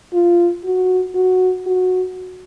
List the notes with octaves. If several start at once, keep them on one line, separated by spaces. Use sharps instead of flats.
F4
F#4
F#4
F#4